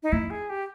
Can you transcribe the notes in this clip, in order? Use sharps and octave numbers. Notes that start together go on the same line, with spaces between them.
D#4
F2 E4
G#4
G4